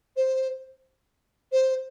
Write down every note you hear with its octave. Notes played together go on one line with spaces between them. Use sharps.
C5
C5